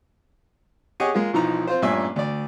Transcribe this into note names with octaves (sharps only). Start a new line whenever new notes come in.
G4 G#4 C#5 D#5 F#5 G#5
G#3 A#3 F4
B1 E3 F3 D#4 A#5
C4 F4 C5
A1 G2 A#2 C#4 E5 G#5
D2 D5